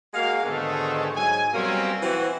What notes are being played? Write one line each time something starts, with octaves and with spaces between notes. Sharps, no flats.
G#3 A#3 F#4 F5
G#2 B2 D3 D#3 G#3 A3
G#2 F#3 D#4 G#5
B2 F#3 G3 A#3 C4 C#4
E3 C4 F#4